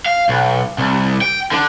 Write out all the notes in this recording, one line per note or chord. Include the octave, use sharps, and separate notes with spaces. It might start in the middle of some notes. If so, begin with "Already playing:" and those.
F5
B1
C2
G5
D3 D4